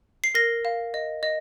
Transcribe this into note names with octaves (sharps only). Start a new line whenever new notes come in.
C7
A#4 A#6
F5
D#5
D#5